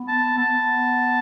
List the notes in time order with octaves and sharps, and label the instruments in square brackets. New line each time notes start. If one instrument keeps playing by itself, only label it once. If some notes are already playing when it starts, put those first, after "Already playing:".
Already playing: [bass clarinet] B3
[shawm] A5
[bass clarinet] B3 [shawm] A5